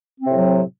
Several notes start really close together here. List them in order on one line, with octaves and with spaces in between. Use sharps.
C4 C3 A2 F#3